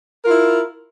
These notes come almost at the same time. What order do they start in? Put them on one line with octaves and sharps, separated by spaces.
A#4 F4 E4